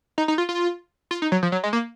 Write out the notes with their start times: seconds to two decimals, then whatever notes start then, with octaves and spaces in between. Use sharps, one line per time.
0.18 D#4
0.28 D#4
0.38 F4
0.49 F4
1.11 F4
1.22 D#4
1.32 F#3
1.43 F3
1.52 F#3
1.64 G#3
1.73 A#3